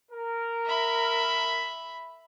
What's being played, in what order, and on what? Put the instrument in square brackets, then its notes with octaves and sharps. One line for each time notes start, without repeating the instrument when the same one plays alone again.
[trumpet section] A#4
[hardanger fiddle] E5 B5